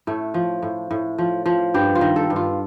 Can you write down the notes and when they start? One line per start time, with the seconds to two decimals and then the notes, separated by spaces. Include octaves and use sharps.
0.07 A2 A3
0.34 F3
0.63 A2
0.91 A2
1.18 F3
1.46 F3
1.74 G2 G4
1.95 F4
2.01 D#3
2.16 A4
2.30 G2
2.36 F4